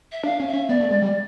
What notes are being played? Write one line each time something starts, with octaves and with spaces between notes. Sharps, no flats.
E5
D4 F5
C#4
E5
C#4
B3 D5
A3
G#3
G3 D5